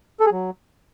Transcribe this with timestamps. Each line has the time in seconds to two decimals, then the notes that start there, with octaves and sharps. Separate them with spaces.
0.20 A4
0.26 G#4
0.32 F#3